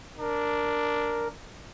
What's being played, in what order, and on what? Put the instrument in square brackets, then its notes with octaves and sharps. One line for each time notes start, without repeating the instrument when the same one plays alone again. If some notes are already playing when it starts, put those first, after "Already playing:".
[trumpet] D4 [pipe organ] A#4